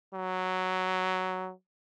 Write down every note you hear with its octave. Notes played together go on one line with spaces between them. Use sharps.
F#3